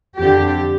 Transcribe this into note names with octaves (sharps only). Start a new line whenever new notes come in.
F2 D3 G4